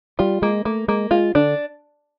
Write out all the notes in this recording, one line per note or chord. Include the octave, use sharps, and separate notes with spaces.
G3 F4
G#3 A#3
A3 A#3
G#3 A#3
G#3 F4
D3 D4